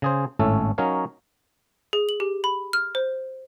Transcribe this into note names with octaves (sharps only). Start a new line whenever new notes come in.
C#3 G#4 C5
G#1 A2 A3 C#4 A4
F#3 C#4 D#4 A#4 C#5 F5
G#4
F#7
G4
B5
F6
C5